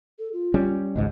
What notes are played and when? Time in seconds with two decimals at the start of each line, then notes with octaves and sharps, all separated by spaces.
0.19 A4
0.33 F4
0.54 G3 C#4
0.96 G#1 C#2 G#2 D#5